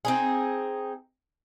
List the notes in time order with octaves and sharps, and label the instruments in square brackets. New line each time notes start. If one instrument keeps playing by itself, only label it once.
[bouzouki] C4 D#4 G#4